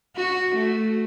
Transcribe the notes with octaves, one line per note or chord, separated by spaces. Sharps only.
F#4
A3